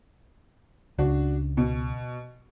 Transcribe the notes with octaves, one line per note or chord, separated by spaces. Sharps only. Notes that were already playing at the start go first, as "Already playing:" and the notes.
C#2 D4 F#4
B2